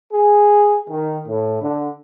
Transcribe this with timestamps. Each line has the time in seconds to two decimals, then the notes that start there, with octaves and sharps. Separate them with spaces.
0.12 G#4
0.89 D#3
1.28 A2
1.61 D3